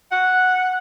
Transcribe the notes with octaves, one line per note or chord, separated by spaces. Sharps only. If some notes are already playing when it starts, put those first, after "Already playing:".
F#5